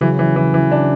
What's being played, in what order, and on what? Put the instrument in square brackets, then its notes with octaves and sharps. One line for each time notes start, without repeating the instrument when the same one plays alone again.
[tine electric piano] C#3 F#3 C#4 F#4 [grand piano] E3
[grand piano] E3
E3
E3
D4